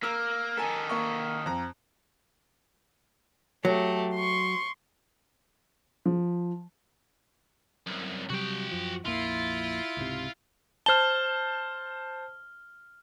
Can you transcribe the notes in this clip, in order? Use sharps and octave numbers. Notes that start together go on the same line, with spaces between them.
A#3 A#4 E6 F6
D#3 A4 A#4 G#5
A#3 C#6
F2 A#5
F#3 A3 G4
C6 C#6
F3
C2 F#2
C3 F#3 G3 F#4 G5
F#2 F3
A#1 F2 A#3 E4 F4
C#2 G#2 C3
C5 A5 F6 G7